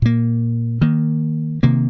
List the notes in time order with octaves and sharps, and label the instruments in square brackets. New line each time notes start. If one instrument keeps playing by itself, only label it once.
[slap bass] A#2 A#3
D#3 A#3
C3 D#3 A#3